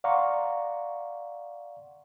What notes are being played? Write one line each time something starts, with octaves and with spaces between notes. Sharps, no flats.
D5 F5 F#5 A#5 C6 C#6